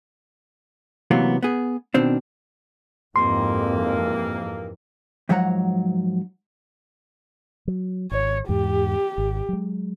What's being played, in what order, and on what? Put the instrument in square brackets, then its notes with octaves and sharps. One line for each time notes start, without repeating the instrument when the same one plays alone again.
[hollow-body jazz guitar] C3 E3 F#3 A#3 B3
B3 G#4
B2 D#3 C4 D4
[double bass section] F2 G#2 [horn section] C3 E3 A#3 [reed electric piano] C6
[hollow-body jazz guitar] G#2 F3 F#3 C#5 F#5 A#5
[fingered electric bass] F#3
[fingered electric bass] G#1 [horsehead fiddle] C#5
[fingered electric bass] E2 G#2 [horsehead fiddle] G4
[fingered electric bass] G#1
F#3 G#3